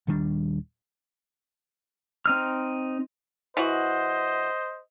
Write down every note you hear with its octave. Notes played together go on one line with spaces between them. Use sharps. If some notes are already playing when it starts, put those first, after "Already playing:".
D#1 D#3 G3 D4
C4 D#4 F6
E3 F#4 C5 D#5